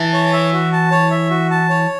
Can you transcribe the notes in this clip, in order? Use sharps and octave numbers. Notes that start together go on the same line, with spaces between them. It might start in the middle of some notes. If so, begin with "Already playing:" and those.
Already playing: E3 E4 A5
C#5
E5
F#4
A5
C#5
E5
F#4
A5
C#5